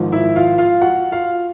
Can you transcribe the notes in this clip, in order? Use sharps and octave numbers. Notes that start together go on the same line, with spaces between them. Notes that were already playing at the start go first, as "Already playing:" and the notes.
Already playing: G#1 G#2 F3
E4 E5
F4 F5
F4 F5
F#4 F#5
F4 F5